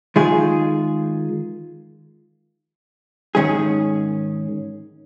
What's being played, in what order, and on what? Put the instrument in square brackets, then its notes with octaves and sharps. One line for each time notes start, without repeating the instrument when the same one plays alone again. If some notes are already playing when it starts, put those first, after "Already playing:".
[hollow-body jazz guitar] D#3 G#3 F4 G#4
G#2 D#3 C#4 G#4